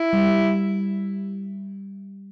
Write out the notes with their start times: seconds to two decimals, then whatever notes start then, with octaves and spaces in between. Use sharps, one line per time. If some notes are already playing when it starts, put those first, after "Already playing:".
Already playing: E4
0.13 G3